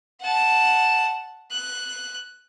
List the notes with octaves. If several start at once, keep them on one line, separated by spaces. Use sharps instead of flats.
F#5 A5
F#6